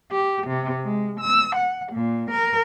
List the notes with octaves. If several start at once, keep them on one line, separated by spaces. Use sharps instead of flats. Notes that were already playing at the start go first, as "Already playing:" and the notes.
G4
C3
G#3
E6
F#5
A#2
A#4